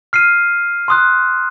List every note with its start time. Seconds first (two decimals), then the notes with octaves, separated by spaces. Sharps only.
0.13 F6 C7 D#7
0.88 C6 D#6 F#6